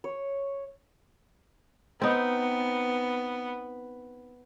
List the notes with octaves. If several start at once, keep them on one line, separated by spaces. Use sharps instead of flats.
C#5
B3 C4 D#4